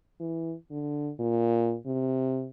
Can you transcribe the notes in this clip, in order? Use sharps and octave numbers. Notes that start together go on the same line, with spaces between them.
E3
D3
A#2
C3